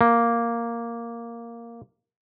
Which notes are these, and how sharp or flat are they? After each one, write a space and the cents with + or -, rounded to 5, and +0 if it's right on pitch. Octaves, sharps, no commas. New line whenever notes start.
A#3 +0